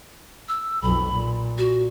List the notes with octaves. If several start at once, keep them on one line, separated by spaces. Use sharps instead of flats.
E6
B1 F2 B5
A#2
F#4